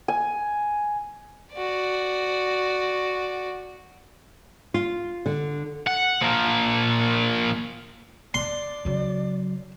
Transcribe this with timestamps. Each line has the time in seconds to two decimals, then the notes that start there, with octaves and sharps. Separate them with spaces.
0.08 G#5
1.54 F#4 D5
4.74 F4
5.26 D3
5.87 F#5
6.22 F3 A#3
8.34 D5 C6
8.85 C#3 F#3